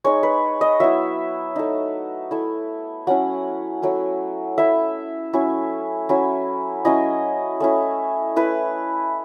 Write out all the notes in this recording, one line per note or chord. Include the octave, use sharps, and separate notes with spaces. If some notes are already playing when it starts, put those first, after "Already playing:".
G#3 D#4 C#5
B4
D#5
F#3 B3 E4 E5
A3 D#4
A3 E4
F#3 C#4 E4 F#5
F#3 A3 E4
A3 E4 E5
F#3 C#4 E4
F#3 C#4 E4
F#3 C#4 E4 D#5
A3 C#4 E4
A3 E4 B4